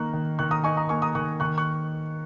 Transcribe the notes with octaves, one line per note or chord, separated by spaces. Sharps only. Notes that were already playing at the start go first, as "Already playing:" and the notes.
Already playing: D#3 A#3 D#4 A#5 C#6 F#6
D#3
D#3 C#6 F#6
A#5 D#6
D#4 G#5 C#6
A#5 D#6
A#3 G#5 C#6
A#5 D#6
D#3 C#6 F#6
D#3 C#6 F#6
C#6 F#6